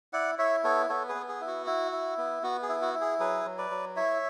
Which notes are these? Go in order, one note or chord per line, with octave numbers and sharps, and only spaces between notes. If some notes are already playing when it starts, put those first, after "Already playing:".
E4 D5 F#5
E4 C#5 E5
B3 A4 C#5
B3 A4 C#5
G#4 B4
B3
G#4
E4
F#4
E4
E4
B3
B3 F#4
G#4
E4
F#4
E4
G#4
F#3 G#4 B4
F#3
B4 D5
F#3
E4 C#5 E5